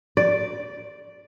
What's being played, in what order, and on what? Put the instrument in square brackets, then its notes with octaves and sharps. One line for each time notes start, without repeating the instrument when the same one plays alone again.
[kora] D5